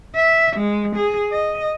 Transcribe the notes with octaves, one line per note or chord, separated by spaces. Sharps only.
E5
G#3
G#4
D#5